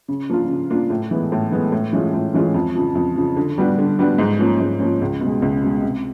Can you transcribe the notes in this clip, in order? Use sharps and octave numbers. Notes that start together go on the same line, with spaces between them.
C#3
F3 A#3 D4 F4
C#3
F3 A#3 D4 F4
A2
E3 G#3 B3
A2
E3 G#3 B3
A2
E3 G#3 C#4 F4
A2
E3 G#3 C#4 F4
F2
C#3 F3
F2
C#3 F3
D3
G3 B3 D4 F#4
D3
G3 B3 D4 F#4
G#2
F3 A#3 C#4
G#2
F3 A#3 C#4
C#2
B2
G#3
C#2
B2 G#3
C3